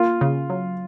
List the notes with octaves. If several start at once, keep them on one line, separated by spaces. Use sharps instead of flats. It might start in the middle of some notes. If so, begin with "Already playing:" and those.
Already playing: A#3 F4
C#3
F#3